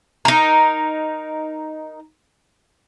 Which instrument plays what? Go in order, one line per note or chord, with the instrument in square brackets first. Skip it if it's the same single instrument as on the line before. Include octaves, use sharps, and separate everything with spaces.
[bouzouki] D#4 A#4